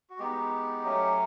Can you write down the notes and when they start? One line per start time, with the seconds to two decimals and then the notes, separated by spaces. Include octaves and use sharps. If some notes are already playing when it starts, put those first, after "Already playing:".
0.10 F#4
0.19 G#3 B3 D#4 G4
0.84 F#3 A3 C#4